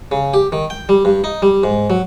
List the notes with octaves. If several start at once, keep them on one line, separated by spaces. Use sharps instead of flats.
C#3
G4
D#3
G5
G3
G2
D#4
G3
G#2
F#3